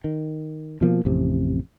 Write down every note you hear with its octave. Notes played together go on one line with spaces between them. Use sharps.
D#3
B2 F3 A#3
A1 F2 C3